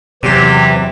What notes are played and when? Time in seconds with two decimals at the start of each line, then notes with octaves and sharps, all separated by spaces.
0.23 E2 C3 E3 F#3 G4 C5